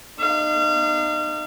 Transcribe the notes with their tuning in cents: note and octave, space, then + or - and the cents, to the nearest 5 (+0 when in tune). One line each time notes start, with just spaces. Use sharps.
D#4 -30 F5 -35